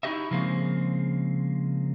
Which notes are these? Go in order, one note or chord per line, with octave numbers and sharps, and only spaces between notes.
D#4 E4 F#4 G4 D#5 E5
C#3 F3 G#3 A#3 C4